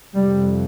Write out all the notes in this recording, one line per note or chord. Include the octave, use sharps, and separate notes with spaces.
F2 C3 G3